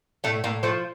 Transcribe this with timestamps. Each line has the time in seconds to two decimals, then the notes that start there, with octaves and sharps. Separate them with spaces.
0.24 A2 A3
0.44 A2 A#3
0.63 F3 A3